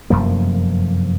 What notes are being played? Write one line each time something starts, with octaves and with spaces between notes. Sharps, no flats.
F1 F#2 F3 A#3